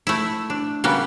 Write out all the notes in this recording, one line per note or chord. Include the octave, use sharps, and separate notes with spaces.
A3 E4
D4
C#3 G3 A#3 B3